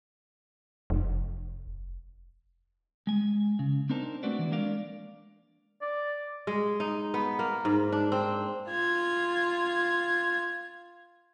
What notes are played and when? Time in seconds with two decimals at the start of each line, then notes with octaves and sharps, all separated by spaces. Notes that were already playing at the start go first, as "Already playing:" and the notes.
0.90 F1
3.07 G#3 G#5
3.59 C#3
3.90 C4 D4 D#4 A#4 C5 A5
4.23 A3 C4 D4 F#4 B4 D5
4.39 E3 D5
4.51 G#3 A#3 D4 A#4 D5 F5
5.82 D5
6.47 G#3
6.80 D#4
7.14 B3
7.39 A#3
7.65 G#2
7.92 D4
8.12 C4
8.70 F4 G#6